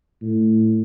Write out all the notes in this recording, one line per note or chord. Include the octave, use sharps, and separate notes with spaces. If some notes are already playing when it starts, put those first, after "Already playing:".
A2